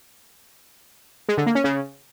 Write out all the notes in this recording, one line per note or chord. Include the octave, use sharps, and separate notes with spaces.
G#3
D3
A#3
C#4
C#3